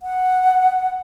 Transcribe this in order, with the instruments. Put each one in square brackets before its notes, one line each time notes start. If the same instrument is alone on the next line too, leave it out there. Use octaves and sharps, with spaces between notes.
[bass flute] F#5